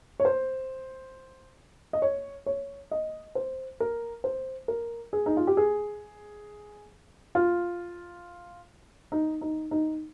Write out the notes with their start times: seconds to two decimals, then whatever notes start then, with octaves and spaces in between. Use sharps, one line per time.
0.20 C#5
0.25 C5
1.93 D#5
2.02 C#5
2.46 C#5
2.91 D#5
3.35 C5
3.80 A#4
4.24 C5
4.68 A#4
5.13 G#4
5.26 D#4
5.37 F4
5.47 G4
5.57 G#4
7.35 F4
9.12 D#4
9.41 D#4
9.71 D#4